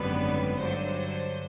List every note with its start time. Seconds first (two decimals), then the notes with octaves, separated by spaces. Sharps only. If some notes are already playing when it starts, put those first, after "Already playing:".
Already playing: G#1 F#2 D3 G3 B3 B4
0.56 G2 D3 F#3 C5